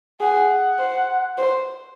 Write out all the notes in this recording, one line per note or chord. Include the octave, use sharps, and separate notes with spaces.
G#4 F#5
C5
C5